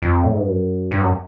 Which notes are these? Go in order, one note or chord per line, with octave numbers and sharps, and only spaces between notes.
F2
A2
G#2
G2
F#2
G2
F#2